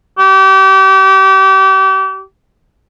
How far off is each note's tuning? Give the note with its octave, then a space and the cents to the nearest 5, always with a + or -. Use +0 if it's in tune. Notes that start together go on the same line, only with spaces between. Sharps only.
G4 -35